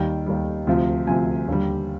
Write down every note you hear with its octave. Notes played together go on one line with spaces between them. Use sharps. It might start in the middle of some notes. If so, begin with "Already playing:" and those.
Already playing: D#2 D#3 G3 G5
D#2 D#3 G3
D2 C3 F3
D2 C3 F3 G#5
D#2 D3 G3